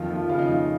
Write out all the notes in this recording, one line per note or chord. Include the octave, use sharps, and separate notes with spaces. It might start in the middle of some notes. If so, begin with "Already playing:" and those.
Already playing: F2 D#3 F4
F3
F4
C#3 F4
D#4
F2 F4